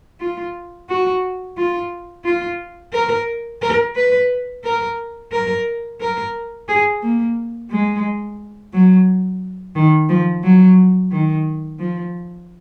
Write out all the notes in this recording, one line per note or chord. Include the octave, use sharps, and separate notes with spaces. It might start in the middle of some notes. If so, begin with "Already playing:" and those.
F4
F#4
F4
F4
A#4
A#4
B4
A#4
A#4
A#4
G#4
A#3
G#3
F#3
D#3
F3
F#3
D#3
F3